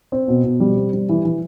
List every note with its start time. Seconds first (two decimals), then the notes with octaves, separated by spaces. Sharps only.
0.12 C4
0.28 B2
0.44 B2
0.60 G3
0.77 C4
0.93 G3
1.09 E3
1.25 E3